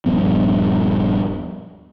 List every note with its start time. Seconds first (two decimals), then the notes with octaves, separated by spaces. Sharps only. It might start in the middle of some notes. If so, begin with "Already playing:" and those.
0.06 D#1 G2 F3 B3